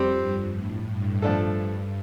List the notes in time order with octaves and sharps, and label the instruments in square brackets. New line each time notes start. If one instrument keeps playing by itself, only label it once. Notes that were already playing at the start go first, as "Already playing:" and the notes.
Already playing: [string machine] F2 [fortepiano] G3 C4 G4 C5
[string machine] G2
A2
G2
[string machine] G2 [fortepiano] F3 A3 D4 A4
[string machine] G2